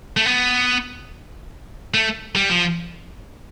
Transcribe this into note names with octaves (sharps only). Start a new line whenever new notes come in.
A3
B3
A3
G3
F3